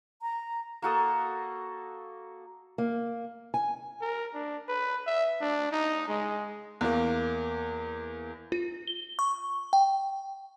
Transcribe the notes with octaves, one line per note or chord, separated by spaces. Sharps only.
A#5
A#3 F#4 A4 D#6
A#3
G#5
A#4
D4
B4
E5
D4
D#4
G#3
E2 A#3
F4
G7
C#6
G5